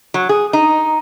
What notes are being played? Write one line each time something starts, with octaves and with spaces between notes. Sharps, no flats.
F#3
G#4
D#4